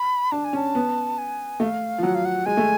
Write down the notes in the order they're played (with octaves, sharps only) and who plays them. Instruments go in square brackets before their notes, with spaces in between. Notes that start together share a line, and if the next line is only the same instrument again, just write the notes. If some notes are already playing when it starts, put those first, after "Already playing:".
Already playing: [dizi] B5
[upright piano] D4 [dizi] A5
[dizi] G#5
[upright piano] C#4
[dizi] A5
[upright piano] B3
[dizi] G#5
[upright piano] A3 [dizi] F5
[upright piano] F3
[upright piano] F#3 [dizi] F#5
[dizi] F5
F#5
[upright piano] G#3 [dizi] G#5
[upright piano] A3